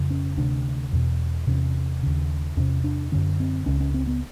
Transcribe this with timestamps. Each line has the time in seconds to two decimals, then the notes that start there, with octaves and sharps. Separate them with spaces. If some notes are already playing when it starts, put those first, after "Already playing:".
Already playing: F2 C#3
0.10 C#4
0.37 D2 C3 D4
0.93 E2 B2
1.47 E2 C3 C#4
2.03 D#2 C#3
2.57 E2 C3 C#4
2.84 D4
3.12 F#2 D3 C#4
3.40 C4
3.66 C#2 C#3 C#4
3.80 C#4
3.94 C4
4.07 B3